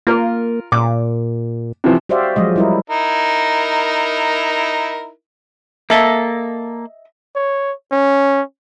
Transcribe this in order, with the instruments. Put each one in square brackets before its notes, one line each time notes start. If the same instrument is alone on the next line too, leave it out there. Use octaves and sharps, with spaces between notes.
[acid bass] A#3 [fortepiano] F4 A#4
[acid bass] A#2 [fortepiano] D6
[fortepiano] C3 E3 F3
[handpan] F#4 G4 C5 D5 E5 F5
F3 F#3 G#3 D#5
G3 E4 A#4
[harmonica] D#4 E4 A#4
[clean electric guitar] A#3 A4 [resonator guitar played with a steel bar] D#5 E5
[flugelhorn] C#5
C#4